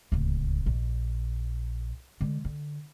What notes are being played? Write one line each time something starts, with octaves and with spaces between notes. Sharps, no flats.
D1 C#2
A#1
D3 G#3
D3